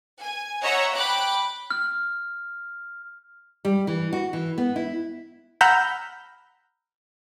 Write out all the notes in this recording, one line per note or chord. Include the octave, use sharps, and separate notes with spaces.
G#5
C#5 D#5 E5 F#5 A#5
G5 B5 D6 F#6
F6
G3
E3
F#4
E3
B3
E4
F#5 A#5 B5 E6 F6 G6